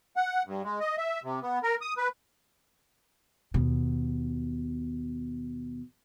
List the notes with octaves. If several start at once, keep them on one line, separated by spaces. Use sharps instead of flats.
F#5
G2
G#3
D#5
E5
C3
B3
A#4
D#6
B4
D#2 B2